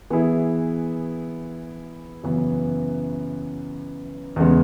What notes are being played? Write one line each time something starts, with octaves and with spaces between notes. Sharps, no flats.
E3 B3 E4 G#4
F#2 C#3 E3 B3
E2 C#3 G#3 B3